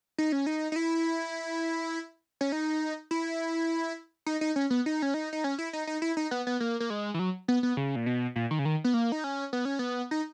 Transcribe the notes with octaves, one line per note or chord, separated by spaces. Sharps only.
D#4
C#4
D#4
D#4
E4
C#4
D#4
E4
D#4
D#4
C#4
B3
D#4
C#4
D#4
D#4
C#4
E4
D#4
D#4
E4
D#4
B3
B3
A#3
A#3
G#3
E3
F#3
B3
B3
C#3
A#2
B2
A#2
D#3
C#3
D#3
B3
A#3
D#4
C#4
B3
C#4
B3
D#4